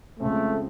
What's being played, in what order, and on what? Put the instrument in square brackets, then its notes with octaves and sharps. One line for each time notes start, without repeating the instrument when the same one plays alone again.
[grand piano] F2 C#3 F3 G#3 C4 [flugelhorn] A3